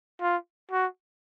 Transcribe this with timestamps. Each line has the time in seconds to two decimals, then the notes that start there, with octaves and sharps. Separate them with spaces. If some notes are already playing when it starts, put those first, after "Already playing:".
0.21 F4
0.71 F#4